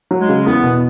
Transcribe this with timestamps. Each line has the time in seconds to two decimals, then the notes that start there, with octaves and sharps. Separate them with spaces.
0.11 F#3
0.20 G#3
0.29 C#3
0.45 E2 B3
0.63 B2